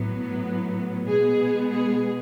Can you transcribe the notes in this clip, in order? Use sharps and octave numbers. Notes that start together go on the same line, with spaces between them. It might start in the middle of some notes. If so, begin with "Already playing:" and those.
Already playing: A2 F#3 B3
B2 G#3 B3 G#4
G#4